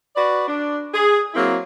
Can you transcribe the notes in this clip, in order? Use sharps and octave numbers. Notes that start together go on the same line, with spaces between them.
F#4 B4 D5
D4
G#4
F#3 A#3 C4 E4